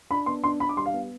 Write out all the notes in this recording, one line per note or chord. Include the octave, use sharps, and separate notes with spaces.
D4 B5
B3 C6
D4 C6
D4 B5
D6
G3 C6
F5
B3